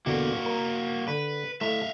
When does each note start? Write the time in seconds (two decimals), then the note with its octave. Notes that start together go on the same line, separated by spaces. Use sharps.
0.06 E2 B2 D3 A#3 F#4
0.46 A#4
1.08 D3 B4
1.61 A3 E4 E5 F5